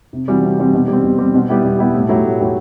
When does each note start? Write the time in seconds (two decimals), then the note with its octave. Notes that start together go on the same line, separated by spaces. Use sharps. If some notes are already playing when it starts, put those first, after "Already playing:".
0.13 C3
0.28 E3 G3 C4 F#4
0.43 C3
0.58 E3 G3 C4 F#4
0.73 B2
0.88 G3
0.93 C4
1.04 B2
1.19 G3 C4
1.34 B2
1.49 G3 B3 E4 G4
1.64 B2
1.78 G3 B3 E4 G4
1.94 A2
2.09 F#3 A3 E4 G4
2.24 A2
2.39 F#3 A3 E4 G4